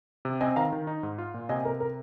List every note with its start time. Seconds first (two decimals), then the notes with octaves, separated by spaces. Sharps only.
0.25 C3
0.41 C4 D#5 G#5
0.56 D#3 F5 A#5
0.72 D#3
0.87 D#4
1.03 G#2
1.18 F4
1.34 A#2
1.49 C3 D#5 G#5
1.65 C3 A#4
1.80 A#4